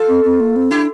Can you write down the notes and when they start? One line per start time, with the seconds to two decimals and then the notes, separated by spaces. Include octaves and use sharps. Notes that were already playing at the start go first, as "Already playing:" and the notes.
Already playing: F4 A4
0.09 C4
0.24 C4
0.40 A#3
0.56 C4
0.71 D4 E4 G4